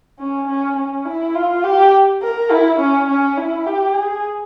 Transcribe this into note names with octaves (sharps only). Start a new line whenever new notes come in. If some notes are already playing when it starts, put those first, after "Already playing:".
C#4
C#4
C#4
E4
F4
G4
A#4
E4
C#4
C#4
E4
G4
G#4